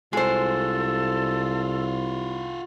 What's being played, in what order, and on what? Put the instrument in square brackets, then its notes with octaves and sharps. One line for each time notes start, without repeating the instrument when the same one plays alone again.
[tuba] C2 [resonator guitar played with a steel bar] G#3 C5 [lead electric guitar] F4 F#4 [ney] A4